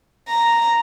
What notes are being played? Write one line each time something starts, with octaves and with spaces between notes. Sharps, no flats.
A#5